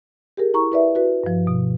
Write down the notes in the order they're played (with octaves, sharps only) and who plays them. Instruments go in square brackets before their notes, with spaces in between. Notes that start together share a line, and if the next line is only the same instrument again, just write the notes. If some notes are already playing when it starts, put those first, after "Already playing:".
[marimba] G4 G#4 A#4
E4 A#5 C#6
E4 B4 D5 E5
F#4 B4
G2 F3
B2